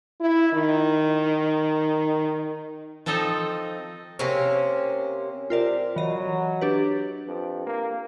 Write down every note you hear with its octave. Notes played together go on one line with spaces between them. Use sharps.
E4
D#3
F3 C4 D#4 A4 D#5
C3 A#3 C4 C#4
C3 F4 A#4 D5
E3 F#3 D#5
D4 G4 B4
F2
A#3